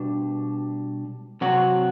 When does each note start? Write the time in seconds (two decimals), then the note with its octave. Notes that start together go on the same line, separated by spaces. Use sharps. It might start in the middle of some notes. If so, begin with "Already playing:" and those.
Already playing: B2 G3 D4
1.41 C3 F#3 C4 F#4